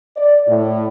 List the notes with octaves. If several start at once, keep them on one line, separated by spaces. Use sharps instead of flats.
D5
A2